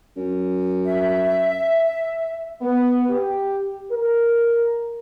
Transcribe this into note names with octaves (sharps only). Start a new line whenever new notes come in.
F#2
E5
B3
G4
A#4